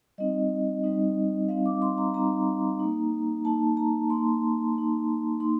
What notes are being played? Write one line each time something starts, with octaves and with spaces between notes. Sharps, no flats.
G3 C4 D#4 D#5
G3 C4 D#4
G3 C4 D#4 F5
D6
C6
A#5
G3 C4 D#4 A#5
A#3 D#4
A#3 D#4 A5
A#5
A#3 D#4 C6
A#3 D#4
A#3 D#4 C6